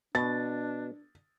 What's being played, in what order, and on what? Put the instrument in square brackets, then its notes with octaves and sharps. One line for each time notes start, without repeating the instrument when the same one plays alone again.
[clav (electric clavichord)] B2 [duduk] D4 [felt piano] A6